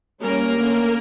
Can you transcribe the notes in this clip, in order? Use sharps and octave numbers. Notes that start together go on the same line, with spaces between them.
G3 A#3 C#4 A#4
D3 A3 C#4